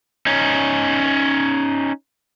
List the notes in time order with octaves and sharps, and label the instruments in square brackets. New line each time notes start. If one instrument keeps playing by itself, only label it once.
[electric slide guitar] C#4 D#4